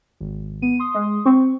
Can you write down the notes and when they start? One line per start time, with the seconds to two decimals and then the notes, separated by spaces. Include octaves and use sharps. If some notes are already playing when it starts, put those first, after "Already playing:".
0.21 G#1
0.62 B3 D#7
0.79 C6 D#6
0.94 G#3
1.26 C4 C#6